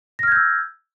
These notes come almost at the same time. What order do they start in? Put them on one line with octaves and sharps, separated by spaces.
A#6 F6 G#6 G6 E6